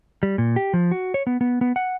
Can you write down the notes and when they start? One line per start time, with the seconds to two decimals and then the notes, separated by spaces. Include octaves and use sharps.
0.23 G3
0.38 A#2
0.56 G4
0.74 F3
0.91 F#4
1.14 C#5
1.27 B3
1.41 B3
1.61 B3
1.76 F#5